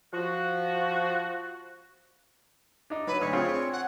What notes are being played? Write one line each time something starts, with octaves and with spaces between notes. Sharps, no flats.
F3 F#4
D4 D#4
F#3 B4
D2 C#5
C4 F4 G#4
F#5